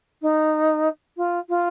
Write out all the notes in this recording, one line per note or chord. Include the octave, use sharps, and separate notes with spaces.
D#4
F4
F4